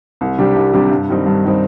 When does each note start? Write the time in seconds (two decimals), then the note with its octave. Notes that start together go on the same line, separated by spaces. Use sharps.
0.21 C2
0.38 C3 G3 D4 G4
0.56 C2
0.73 C3 G3 D4 G4
0.91 G2
1.09 D#3 G3 C4 D#4
1.26 G2
1.44 D#3 G3 C4 D#4